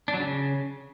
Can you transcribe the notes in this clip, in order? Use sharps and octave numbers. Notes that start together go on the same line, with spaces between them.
D4
F#3
C#3